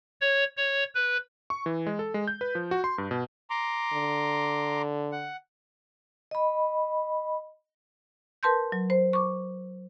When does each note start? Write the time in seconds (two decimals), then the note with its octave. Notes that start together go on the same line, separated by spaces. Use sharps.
0.21 C#5
0.57 C#5
0.95 B4
1.50 C#6
1.66 E3
1.87 G#3
1.99 A4
2.14 G#3
2.27 G6
2.41 B4
2.55 F3
2.71 F#4
2.84 C6
2.98 G2
3.11 B2
3.50 A#5 C6 D6
3.93 D3
5.12 F#5
6.31 D#5 B5
8.43 A#4 B4 A5 C6 G6
8.72 F#3
8.90 C5
9.13 C#6 D6